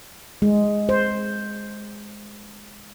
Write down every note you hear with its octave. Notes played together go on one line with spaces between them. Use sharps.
G#3
C5